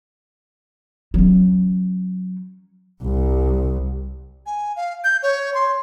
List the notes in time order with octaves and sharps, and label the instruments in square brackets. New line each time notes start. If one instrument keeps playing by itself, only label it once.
[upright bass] F#3 C#4
[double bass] C2
[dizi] G#5
F5
G6
C#5
C6